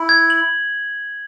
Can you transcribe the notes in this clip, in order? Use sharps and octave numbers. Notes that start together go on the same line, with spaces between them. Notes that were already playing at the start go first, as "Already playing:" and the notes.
Already playing: E4
G#6
F#7